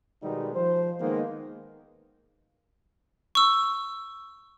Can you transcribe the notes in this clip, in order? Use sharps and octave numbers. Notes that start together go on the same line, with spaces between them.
B2 D#3 G3 G#3 B3 D#4
F3 C5
D#3 G#3 A#3 B3 D#4
C#6 E6